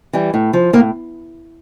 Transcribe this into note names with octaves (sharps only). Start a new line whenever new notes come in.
E3 G3
A2
F3
A2 A#3